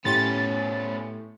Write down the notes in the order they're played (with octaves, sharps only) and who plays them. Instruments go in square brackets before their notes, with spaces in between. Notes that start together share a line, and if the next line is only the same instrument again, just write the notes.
[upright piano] A2 G4 C6 [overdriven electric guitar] B3 C#4 [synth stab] A6